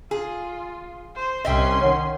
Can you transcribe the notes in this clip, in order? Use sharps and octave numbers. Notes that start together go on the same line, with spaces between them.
F4 G#4
C5
C2 C#4 D#5 E5 G5 C6
D#3 C#5 F#5